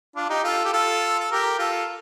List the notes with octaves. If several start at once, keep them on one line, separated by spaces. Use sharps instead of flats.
D4 F4
D#4 G4
F4 A4
G4
F4 A4
A4
G4 A#4
F4 A4